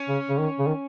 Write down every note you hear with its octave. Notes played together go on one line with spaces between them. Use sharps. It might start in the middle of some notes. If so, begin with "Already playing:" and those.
Already playing: C#4
C#3
C#3
D#3
C#3
D#3